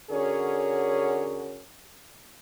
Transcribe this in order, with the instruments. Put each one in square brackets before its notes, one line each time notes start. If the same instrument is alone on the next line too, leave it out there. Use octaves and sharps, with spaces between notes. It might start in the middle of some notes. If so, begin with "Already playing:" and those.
[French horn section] D3 C#4 F#4 G#4 A#4 C#5